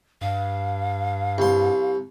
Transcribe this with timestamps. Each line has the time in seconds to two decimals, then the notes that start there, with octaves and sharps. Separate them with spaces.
0.21 G2 F5
1.38 C2 C6